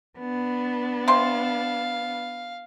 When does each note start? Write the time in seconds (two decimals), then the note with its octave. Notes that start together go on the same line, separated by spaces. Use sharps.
0.18 B3 D4
1.08 C3 F5 C6